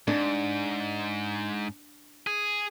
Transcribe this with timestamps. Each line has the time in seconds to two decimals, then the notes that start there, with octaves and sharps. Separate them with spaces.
0.08 G#2 D4
2.27 G#4